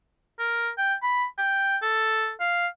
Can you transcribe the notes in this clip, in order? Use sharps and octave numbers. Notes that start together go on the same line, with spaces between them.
A#4
G5
B5
G5
A4
F5